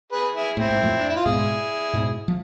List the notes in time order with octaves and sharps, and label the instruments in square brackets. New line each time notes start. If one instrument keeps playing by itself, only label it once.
[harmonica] G#4 B4
E4 G#4
[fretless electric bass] A2 [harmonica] C4 E4
[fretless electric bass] G#2
F2 A2
[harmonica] D4
E4
F4
[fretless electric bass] G#2 B2 [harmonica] E4 G#4
[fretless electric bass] G#2 B2
F3